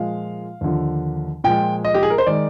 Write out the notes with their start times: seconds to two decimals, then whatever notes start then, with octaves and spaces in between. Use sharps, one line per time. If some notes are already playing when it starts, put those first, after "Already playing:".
Already playing: A#2 F3 G#3 F5
0.61 D#2 D3 F3
1.44 A#2 F3 G#3 G5
1.85 D#5
1.94 G4
2.03 G#4
2.10 A#4
2.18 C5
2.26 D#3 G#3 D5